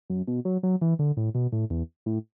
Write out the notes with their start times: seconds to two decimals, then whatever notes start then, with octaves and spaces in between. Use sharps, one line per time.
0.10 F#2
0.28 B2
0.45 F#3
0.63 F#3
0.81 E3
0.99 D3
1.17 A2
1.35 B2
1.52 A2
1.70 E2
2.06 A2